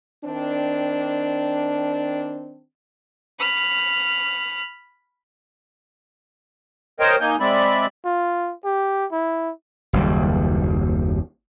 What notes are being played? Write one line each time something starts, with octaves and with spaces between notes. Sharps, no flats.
D#3 C4 D4
B5 F6
A#4 C5 C#5 D#5 G5
A#3 D#4 G#5 G6
G#3 C4 D5 E5 B5
F4
G4
E4
F#1 D#2 G3